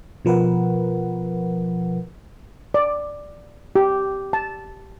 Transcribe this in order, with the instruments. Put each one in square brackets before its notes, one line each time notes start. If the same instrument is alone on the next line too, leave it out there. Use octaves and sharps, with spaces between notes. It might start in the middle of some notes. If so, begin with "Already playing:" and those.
[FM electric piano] B2 F3 A#4 B4 F#5
[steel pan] D5
G4
A5